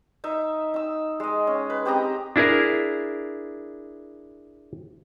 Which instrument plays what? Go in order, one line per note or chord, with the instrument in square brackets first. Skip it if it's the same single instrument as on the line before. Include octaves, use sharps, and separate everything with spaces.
[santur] D#4 E5
D#4 E6
G#3 D#5
C#4
B4
C4 G4 D#5 A#5
[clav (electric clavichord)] D4 E4 G#4 A#4